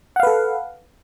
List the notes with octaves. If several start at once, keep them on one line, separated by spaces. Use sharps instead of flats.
A4 B4 F5 F#5